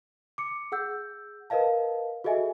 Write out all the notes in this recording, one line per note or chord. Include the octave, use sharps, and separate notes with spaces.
D6 C#7
G#4 F#5 E6 G6
A#4 B4 D#5 F5 A5
F#4 G#4 A4 D#5 E5 G#5